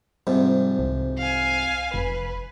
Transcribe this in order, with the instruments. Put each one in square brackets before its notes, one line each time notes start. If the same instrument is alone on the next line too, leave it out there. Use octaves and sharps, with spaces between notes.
[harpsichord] F2 G#2 C3 [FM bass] G3
[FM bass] C2
[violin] F5 G#5
[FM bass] F1 [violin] B4